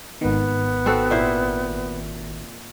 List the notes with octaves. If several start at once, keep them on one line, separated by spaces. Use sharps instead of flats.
G#1 D#3 B3
C4 F#4 A4
A#2 E4 C5